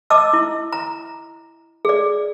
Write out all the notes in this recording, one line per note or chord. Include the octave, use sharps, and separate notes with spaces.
D#5 A5 D6 E6
E4
A#5
G#4 D5